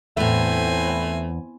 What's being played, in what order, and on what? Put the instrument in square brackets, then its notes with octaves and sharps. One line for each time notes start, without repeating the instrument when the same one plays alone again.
[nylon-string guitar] E2 [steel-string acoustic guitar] A2 E4 [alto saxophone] A3 [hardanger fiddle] C4 G#5